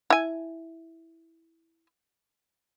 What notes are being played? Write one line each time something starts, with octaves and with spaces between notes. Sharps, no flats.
E4 G#5